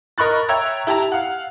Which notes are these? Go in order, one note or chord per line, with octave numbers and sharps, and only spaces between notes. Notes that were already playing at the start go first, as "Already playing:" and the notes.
A#4 D#5 B5 C#6 F#6 A6
C#5 E5 G5 A#5 E6 G#6
E4 G4 A5 A#5
F5 F#5